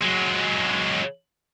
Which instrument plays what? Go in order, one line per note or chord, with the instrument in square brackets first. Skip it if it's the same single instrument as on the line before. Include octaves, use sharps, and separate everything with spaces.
[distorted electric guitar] F#3 G#3